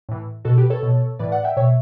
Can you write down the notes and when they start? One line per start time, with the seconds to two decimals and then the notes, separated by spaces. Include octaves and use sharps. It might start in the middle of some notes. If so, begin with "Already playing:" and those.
0.09 A2 E3
0.45 B2 F#4 A4
0.58 G4 B4
0.70 A4 C#5
0.83 B2
1.19 A2 E3 B4 D5
1.32 D5 F#5
1.44 E5 G5
1.57 B2 C#5 E5